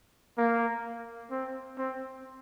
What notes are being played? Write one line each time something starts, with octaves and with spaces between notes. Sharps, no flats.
A#3
C4
C4